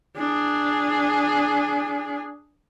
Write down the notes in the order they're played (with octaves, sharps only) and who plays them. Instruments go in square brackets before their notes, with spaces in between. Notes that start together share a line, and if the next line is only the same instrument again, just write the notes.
[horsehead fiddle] D4 G#4